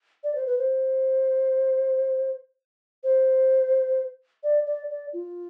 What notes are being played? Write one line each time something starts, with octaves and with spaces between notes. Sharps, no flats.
D5
C5
B4
C5
C5
D5
D5
D5
F4